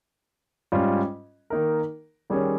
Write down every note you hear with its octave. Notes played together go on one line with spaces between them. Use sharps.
G#2 G3 C#4 F4
D#3 A#3 D#4 A#4
D#3 G3 C#4 G#4 C#5